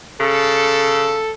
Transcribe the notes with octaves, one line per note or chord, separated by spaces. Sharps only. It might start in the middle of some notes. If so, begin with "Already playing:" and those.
C#3 A4